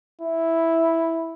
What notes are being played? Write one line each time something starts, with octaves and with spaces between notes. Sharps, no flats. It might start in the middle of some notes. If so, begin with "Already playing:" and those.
E4